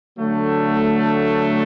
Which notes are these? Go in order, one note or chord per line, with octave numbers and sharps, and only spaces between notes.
D3 F#3 A3